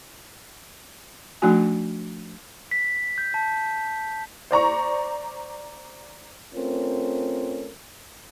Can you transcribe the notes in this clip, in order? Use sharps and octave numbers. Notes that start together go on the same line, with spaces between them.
F3 A3 D4 D#4 F#4 G#5
B6
G6
A5
C5 D5 A#5 C#6
A3 C4 C#4 F4 A#4